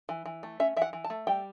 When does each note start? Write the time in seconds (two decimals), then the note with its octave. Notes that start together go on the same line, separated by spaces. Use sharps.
0.09 E3
0.25 E3
0.43 A3
0.60 C#4 E5
0.76 E3 E5
0.82 F#5
0.93 E3
1.04 A5
1.10 A3
1.27 G3 G5